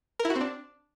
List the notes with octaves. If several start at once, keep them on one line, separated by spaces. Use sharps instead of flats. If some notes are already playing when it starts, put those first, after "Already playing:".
A#4
E4
F#4
C4
D4